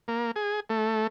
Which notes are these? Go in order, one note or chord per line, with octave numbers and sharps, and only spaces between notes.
A#3
G#4
A3